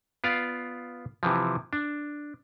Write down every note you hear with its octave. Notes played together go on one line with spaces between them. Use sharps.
B3 F4 D5 F5
C3 E3 F3
D4